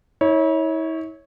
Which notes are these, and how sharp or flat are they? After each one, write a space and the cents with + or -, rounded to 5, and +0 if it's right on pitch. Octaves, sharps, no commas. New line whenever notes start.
E4 -40 C#5 +0